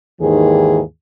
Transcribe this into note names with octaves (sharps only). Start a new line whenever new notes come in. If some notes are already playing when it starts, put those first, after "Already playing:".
D#2 G#2 D#3 E3 G#4